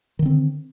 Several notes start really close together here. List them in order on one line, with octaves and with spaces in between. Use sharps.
D#3 D3 C4